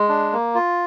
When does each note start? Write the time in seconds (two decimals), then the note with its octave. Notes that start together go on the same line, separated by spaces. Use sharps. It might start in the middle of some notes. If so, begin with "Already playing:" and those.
Already playing: G#3
0.09 D4
0.33 A#3
0.55 F4